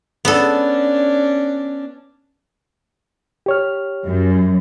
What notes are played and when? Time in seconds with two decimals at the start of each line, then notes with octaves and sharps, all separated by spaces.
0.25 B3 C#4 D4 A4
3.46 G4 C#5 F6
4.04 F#2